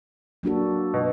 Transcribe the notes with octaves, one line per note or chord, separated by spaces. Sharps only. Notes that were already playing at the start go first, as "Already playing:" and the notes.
F#3 A#3 D4 F#4 A4
B2